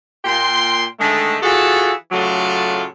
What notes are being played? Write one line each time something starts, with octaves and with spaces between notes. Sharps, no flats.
A#2 G5 C6
D3 D#3 G#3 A3
E3 F4 F#4 G#4 A4
A2 C#3 F#3 A3 D4 F4